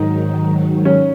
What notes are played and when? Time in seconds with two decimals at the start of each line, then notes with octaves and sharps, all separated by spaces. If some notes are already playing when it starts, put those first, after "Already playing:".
Already playing: G#2 D#3 F#3 D#4
0.85 C#4